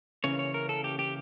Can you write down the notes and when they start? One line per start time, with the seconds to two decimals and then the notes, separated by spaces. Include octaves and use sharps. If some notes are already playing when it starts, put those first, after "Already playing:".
0.24 C#3 E3 A#3 C#4 C#5
0.39 C#5
0.54 A#4
0.69 A4
0.84 G4
0.99 G4